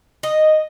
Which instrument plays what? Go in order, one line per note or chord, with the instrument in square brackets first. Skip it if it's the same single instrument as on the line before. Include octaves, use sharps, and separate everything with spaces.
[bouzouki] D#5